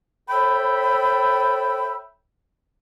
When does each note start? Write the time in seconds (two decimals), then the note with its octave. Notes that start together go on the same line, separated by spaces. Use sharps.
0.29 A4 C5 C#5 E5 G5 B5